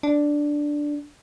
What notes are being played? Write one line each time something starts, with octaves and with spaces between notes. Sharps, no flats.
D4